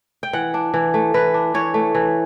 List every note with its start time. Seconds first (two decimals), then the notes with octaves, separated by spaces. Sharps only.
0.23 G5
0.33 E3 F#5
0.54 D4
0.74 E3
0.94 A3
1.14 E3 B4
1.34 D4
1.54 E3 C#5
1.74 A3
1.95 E3